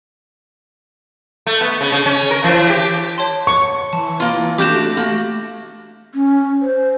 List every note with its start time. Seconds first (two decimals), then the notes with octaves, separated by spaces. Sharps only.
1.47 A3
1.61 B3
1.81 C#3
1.92 C#3
2.06 C#4
2.31 A#4
2.44 E3
2.70 G4
3.18 C#5 A5 C6
3.47 C#6
3.93 E3 A5
4.20 A#3 F4
4.58 A3 D4 F#4 G4 D6 G6 E7
4.97 A#3 F#4
6.14 C#4
6.62 C5